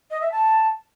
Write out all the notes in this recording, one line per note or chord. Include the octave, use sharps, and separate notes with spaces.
D#5
E5
A5